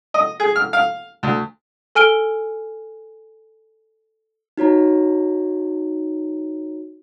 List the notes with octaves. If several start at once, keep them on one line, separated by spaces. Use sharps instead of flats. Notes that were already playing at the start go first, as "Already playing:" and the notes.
D#5
G#4
F6
F5
D2
A4 G#5 F6 D7 G7
D#4 F#4 C#5 A#5